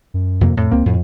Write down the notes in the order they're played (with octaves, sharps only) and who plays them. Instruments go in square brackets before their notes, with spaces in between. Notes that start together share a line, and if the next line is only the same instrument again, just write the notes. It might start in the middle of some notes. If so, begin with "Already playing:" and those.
[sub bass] F#2
[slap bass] F2 C3 A#3
[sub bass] F2 [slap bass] A2
[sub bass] C#2 [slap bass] A#3 C4
[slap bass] F2 [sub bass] A2